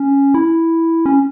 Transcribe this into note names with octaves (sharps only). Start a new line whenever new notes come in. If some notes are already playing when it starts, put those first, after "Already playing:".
Already playing: C#4
E4
C#4